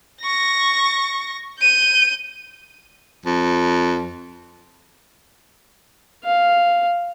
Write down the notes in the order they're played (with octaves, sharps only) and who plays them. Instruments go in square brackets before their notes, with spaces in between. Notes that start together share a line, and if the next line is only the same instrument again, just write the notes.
[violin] C#6 A#6
G6 D#7
[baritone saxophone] F2
[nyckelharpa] F5